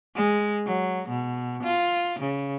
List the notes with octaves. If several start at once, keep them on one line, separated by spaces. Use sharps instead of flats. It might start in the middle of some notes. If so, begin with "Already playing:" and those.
G#3
F#3
B2
F4
C#3